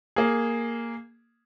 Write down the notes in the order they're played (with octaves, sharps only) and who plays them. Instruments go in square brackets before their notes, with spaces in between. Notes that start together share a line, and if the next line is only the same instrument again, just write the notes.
[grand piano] A#3 G#4